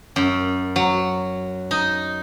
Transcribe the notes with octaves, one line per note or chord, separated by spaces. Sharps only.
F#2
F#3
D#4